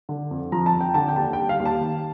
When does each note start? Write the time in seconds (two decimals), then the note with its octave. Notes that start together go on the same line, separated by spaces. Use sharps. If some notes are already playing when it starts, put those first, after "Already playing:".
0.09 D3
0.31 F2
0.52 F3 A#5
0.66 A5
0.74 F2
0.81 G5
0.94 D3 A5
1.08 G5
1.16 D#2 A5
1.33 G5
1.38 G3
1.49 F5
1.60 D#2
1.66 A5
1.81 D#3